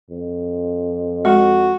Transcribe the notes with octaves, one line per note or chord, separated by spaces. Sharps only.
F2
G#3 F#4